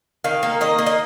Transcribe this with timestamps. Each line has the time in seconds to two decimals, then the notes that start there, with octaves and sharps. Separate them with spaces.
0.24 D#3 F5
0.43 A#3
0.61 D#3 D#5
0.78 A#3
0.86 D#5